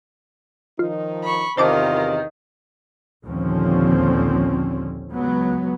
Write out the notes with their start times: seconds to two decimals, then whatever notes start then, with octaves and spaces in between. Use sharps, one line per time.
0.79 D#3 F3 D#4 F4
1.23 B5 C#6
1.57 E2 C3 D#3 F4 A#4 C5 A5 D6
3.24 A#1 D#2 D3 F3 C4 C#4
5.11 C#2 F#3 B3